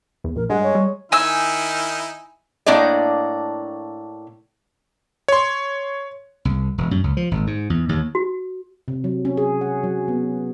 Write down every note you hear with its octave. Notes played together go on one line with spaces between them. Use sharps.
E2
A#1 A#4
G2 G#3 F#5
C#5
G3
D#3 D#4 E4 G#5 E6
A2 A#3 D4 D5 D#5
C#5 C6
C2
E1
F#2
C#2
F3
G#1
G#2
E2
D#2
F#4
C3
F#3
C#4
G#4
F#5
F#3
B3